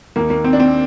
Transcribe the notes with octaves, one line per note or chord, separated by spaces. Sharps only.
D#2 D#3 A#3
A#3
C4
D4
C4